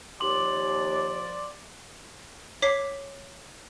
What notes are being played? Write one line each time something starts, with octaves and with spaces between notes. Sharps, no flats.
D#2 F3 D5 C6 D6 F#7
C#5 D6 B6 C7